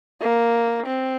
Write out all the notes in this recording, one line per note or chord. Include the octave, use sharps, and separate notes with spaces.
A#3
C4